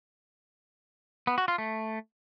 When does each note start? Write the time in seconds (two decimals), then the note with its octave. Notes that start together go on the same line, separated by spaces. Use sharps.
1.27 B3
1.38 F#4
1.48 F4
1.58 A3